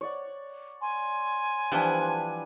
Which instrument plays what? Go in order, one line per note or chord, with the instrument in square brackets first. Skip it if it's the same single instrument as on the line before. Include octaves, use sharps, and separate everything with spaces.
[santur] C#5 D5 F#5
[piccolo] G#5 [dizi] C6
[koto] E3 F3 B3 [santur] G3 D4